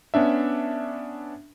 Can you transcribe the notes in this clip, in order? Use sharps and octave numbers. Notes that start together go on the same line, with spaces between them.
B3 C#4 D4 E5